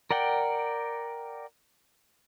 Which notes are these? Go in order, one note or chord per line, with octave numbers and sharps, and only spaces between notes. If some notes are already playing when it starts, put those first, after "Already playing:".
A#4 D5 F#5 G5